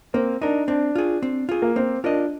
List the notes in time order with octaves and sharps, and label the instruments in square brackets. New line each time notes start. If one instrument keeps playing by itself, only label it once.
[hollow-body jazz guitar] A#3 [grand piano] C4
[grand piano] D4 [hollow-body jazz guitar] D#4 A#4
[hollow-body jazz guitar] C4 [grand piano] D4
[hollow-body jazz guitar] F4 G#4
C4
F4 G#4
[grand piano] A#3
[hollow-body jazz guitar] A#3 [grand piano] C4
[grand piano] D4 [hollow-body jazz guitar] F4 A#4 D#5